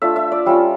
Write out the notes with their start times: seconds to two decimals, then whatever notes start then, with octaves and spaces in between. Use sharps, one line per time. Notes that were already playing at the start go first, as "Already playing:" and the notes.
0.02 A3 D4 F4 E5
0.16 E5
0.32 D5
0.46 G3 C#4 F4 E5